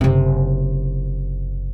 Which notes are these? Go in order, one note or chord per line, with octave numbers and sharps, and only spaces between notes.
F#1 C3